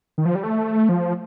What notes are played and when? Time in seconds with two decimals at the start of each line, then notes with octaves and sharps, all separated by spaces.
0.18 D#3
0.25 F3
0.35 G3
0.43 A3
0.89 F3